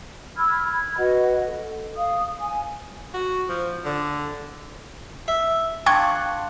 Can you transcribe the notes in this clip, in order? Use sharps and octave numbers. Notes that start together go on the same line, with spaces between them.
B5 E6 F6 G#6
B5 G#6
F#4 B4 D#5 F#5
A4
F5 D#6
G#5
F#4
F3
D3
E5
D4 F4 F#5 G5 C#6 G#6